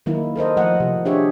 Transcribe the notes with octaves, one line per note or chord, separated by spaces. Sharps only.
D#3 F#3 A#3 D#4 E4
A4 A#4 C5 D#5
F3 A3 D#5 F#5
C3 F3
D4 G4 G#4 C#5 E5